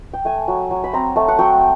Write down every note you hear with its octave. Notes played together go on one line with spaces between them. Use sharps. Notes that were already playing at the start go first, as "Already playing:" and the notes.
G5
A3 G#5
F#3
F#3
B5
C4 A#5
A3 A5
F#5
F#3 G5